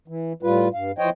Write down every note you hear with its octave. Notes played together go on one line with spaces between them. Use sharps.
E3
A2 G3 F4 B4
G2 F5
E3 F3 C5 C#5 D#5 G5